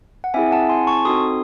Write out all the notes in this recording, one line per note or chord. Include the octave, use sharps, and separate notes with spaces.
F#5
C4 E4 G#4 E5 G#5
F#5 A5
G#5 C6
A5 C#6
C4 D#4 F#4 A4 C6 D#6